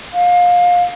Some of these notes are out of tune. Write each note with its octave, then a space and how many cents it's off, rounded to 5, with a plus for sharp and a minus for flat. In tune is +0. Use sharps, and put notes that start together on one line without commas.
F5 +25